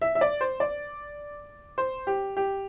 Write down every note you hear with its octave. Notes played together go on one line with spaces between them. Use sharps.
E5
E5
D5
C5
D5
C5
G4
G4